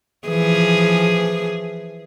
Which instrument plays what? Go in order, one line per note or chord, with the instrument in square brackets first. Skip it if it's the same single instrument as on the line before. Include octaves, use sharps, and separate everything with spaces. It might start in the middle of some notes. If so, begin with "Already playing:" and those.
[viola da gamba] E3 F3 G#4